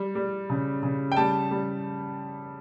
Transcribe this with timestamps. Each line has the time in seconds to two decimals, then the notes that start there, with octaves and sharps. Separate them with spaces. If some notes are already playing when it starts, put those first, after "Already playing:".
Already playing: G3
0.15 G3
0.50 C#3
0.83 C#3
1.12 G5
1.16 G3 A5
1.51 G3